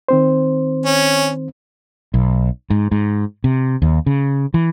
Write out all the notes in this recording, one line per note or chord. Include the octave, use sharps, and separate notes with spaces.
D#3 C4 C5
C#4
B1
G#2
G#2
C3
D#2
C#3
E3